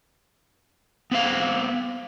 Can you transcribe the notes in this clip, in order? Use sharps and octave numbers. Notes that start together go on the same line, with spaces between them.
B3 C4 F5